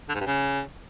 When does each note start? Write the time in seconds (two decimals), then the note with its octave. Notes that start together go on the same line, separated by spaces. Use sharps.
0.09 D3
0.15 G#2
0.21 G2
0.26 C#3